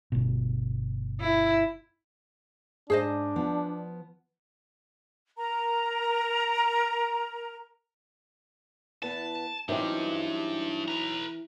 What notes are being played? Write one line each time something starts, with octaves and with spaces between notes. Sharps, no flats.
G1 B2
E4
G#2 D4 G#4 C5 D#5
F3 B3
A#4 A#5
E2 B3 A5
E3 F#3 B3 C4 D4 D#4 G4
B4 A#5